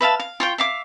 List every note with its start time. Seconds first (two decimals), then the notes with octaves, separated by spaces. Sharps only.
0.01 B4 E5 F5 A5
0.20 F5
0.40 F4 C#5 G5
0.58 E5 F5 D6